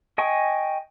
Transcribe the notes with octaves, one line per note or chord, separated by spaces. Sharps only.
D#5 G5 G#5 C#6